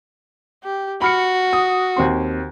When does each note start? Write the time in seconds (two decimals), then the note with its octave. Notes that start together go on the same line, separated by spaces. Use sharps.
0.64 G4
1.02 F#4 B5 F6 C#7
1.53 D#6
1.96 D#2 C4 C6